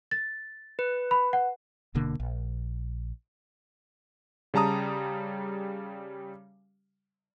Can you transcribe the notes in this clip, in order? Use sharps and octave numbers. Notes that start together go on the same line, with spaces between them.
A6
B4
B5
F#5
D#1 B2 D3 A#3
A#1
C#3 G3 A5 A#5 D#6